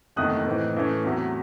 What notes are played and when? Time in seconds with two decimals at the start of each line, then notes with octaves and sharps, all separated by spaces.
0.16 F#1 E2 C3 D#3 A3 D#6 F#6
0.47 A2 E3 C4 D#4
0.76 A2 E3 A3 C#4
1.04 E2 C3 F#3 A3